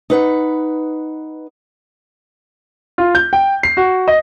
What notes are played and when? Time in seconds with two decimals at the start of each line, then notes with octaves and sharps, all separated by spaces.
0.10 D#4 B4 F#5
2.98 F4
3.15 G6
3.33 G5
3.63 C7
3.77 F#4
4.08 D#5